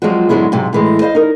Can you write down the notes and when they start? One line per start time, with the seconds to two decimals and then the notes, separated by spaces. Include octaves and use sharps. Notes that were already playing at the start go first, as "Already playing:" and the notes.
0.02 F3 F#3 G#3 C4 F4 F#4
0.29 G#2 D3 F#3 G#3 B3 E4
0.52 G#2 C3 F#3 G#3
0.73 A2 E3 G#3
1.01 C5 D#5 F5
1.15 D#4 A#4